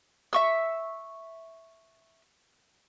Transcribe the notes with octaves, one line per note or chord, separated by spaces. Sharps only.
E5 C#6 E6